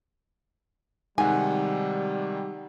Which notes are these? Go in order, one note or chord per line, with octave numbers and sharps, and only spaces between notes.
C3 D#3 G3 G#3 D#4 F#5 G#5